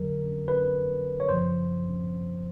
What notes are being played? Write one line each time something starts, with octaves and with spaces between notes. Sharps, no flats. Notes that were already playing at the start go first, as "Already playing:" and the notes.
Already playing: F2 D3 F#3 A#4
B4
C#5
F#2 C#3 F3 C5